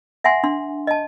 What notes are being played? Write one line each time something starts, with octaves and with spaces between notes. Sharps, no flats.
E5 F#5 G#5 C6
D4 C6
D#5 A5